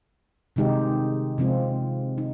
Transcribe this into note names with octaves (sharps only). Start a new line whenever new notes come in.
C3 D#3 G#3 D#4 G4
C3 F3 G#3 C4 F4
D#4